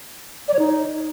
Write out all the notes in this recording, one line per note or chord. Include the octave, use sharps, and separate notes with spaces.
D5
C#5
D#4